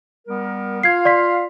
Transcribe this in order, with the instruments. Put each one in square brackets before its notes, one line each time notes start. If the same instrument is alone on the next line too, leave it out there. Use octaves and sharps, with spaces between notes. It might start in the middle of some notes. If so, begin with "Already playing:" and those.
[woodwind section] G3 B3 A#4
[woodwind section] F4 F5 [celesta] G#6 C7
[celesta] D5 C6 B6